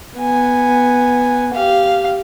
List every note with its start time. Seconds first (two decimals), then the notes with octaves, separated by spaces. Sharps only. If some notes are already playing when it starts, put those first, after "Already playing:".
0.18 B3 G#5
1.54 G4 F5